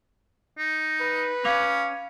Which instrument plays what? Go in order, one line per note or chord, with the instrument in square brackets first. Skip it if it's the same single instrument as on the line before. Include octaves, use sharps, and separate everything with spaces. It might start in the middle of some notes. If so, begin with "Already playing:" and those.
[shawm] D#4
[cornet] B4
[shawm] C#4 [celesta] F5 D6 F7